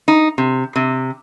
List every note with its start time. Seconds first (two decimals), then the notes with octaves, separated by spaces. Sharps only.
0.08 D#4
0.38 C3
0.76 C3